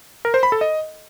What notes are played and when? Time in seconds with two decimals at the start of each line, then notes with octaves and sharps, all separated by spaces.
0.25 A#4
0.34 C5
0.43 B5
0.52 A4
0.61 D#5